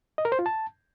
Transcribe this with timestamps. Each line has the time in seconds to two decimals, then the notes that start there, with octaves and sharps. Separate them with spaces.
0.18 D#5
0.25 A#4
0.32 C5
0.39 F4
0.46 A5